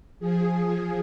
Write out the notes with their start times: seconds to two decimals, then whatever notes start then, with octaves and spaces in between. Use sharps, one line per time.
0.20 F3 G#4